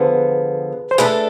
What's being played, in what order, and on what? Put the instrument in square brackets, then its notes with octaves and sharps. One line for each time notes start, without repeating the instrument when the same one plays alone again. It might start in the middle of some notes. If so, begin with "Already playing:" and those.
Already playing: [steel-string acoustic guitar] D3 F3 B3 [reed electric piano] G#4 B4
[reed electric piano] C5
[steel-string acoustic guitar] A3 D4 A4 [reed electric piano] G#4 B4